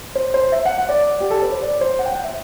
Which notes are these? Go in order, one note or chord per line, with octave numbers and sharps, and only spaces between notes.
C5
C5
E5
F#5
F#5
D5
G4
A4
B4
C5
D5
C5
F#5
G5
F#5
E5